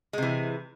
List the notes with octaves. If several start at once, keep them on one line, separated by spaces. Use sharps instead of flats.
C3 E3 G#3